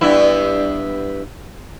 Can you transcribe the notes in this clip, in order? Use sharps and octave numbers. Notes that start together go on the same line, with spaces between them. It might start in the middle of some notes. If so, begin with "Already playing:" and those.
G2 B3 E4